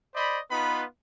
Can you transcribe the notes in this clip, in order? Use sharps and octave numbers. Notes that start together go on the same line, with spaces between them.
C5 D5 D#5 B5
B3 D#4 F4 B4 B5